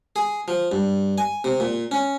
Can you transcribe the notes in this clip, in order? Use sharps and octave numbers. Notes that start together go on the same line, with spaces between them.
G#4
F3
G2
G#5
C3
A#2
C#4